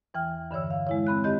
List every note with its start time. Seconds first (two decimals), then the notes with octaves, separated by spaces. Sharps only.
0.14 E2 E3 G5 F6
0.51 G2 D3 E3 C#5 E6
0.71 F5
0.87 G#3 E4 C#5
1.07 C4 B5 F#6
1.24 F2 D#3 C4 G4 D#5 G6